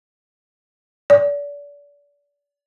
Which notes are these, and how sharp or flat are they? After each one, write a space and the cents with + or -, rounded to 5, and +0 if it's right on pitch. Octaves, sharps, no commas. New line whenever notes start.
D5 -35